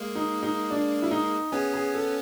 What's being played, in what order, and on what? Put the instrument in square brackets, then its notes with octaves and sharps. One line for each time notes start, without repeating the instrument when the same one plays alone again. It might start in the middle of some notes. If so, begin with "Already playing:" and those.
Already playing: [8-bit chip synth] G#3 A#3
[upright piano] D#4
D#4
D4
E4
D#4
[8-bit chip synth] B3 C#4 [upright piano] G#4
[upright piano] G#4
A4